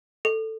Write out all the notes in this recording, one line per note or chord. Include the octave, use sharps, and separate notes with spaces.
A4